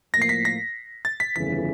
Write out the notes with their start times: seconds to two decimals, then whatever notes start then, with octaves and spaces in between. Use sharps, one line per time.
0.14 A2 F3 A#3 A#6
0.22 C7
0.29 B6
0.45 A#6
1.05 A6
1.20 B6
1.36 G1 F2 C#3 E3 B6